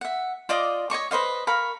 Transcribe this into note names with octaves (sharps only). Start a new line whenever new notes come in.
E5 F#5
F4 D5 D#5 D6
C#5 D#5 C#6 D6
B4 C5 D#5 F5
A#4 F5 B5 C#6